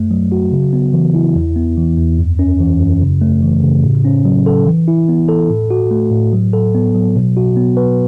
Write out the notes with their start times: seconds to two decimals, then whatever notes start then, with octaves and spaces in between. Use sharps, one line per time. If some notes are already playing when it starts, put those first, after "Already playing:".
Already playing: F#2 A3
0.11 F#3
0.32 F#4
0.52 C#3
0.73 B3
0.93 E3
1.15 E4
1.35 E2
1.56 B3
1.77 E3
1.98 E2
2.18 F#2
2.39 C#4
2.60 E3
2.80 F#2
3.02 C#3
3.21 A3
3.42 E3
3.62 C#3
3.83 A2
4.05 C#4
4.25 F#3
4.46 A4
4.66 E3
4.88 E4
5.09 B3
5.28 A4
5.50 A2
5.71 F#4
5.91 A3
6.11 A2
6.33 F#3
6.53 A4
6.74 B3
6.95 F#3
7.16 B2
7.37 F#4
7.56 B3
7.77 B4